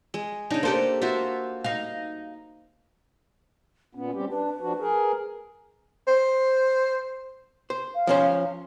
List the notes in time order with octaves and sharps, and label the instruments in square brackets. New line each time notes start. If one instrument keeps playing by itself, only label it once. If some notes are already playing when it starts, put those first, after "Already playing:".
[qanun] G#3
[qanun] C#3 D4 [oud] D#4
[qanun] A#3 D5 [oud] G4 A4 C5
[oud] F4 [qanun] F#4 C5 E5
[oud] D#4 F5
[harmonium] A#2 B3 [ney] C#4
[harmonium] G3 C4 G4
[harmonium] D4 [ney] B4
[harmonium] F3 D4 F#4
G#4 A#4
[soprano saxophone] C5
[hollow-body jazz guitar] C5
[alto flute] F5
[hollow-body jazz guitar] F3 C#4 C5